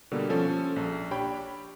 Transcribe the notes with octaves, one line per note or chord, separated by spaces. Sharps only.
B2 D3 G3 A#3
F3 C#4 A4
A#1
D4 G4 C#5 G5 B5